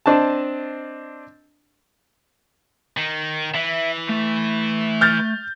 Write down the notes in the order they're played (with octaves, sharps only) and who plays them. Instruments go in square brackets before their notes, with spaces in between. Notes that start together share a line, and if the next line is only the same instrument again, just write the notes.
[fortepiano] C4 D4 D#5 A5
[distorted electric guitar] D#3
[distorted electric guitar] E3 [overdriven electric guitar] E5
[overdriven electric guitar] A3
[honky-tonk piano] F6 G6 A6